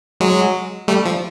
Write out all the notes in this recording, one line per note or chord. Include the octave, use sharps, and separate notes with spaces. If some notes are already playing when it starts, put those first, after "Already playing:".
F#3 G#3
G3 A3
F3